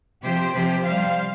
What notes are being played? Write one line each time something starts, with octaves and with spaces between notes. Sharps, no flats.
C3 F3 G4 C5
C3 F3 G4 C5
C3 G3 C5 F5